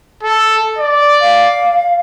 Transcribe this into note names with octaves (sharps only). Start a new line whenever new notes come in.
A4
D5
F5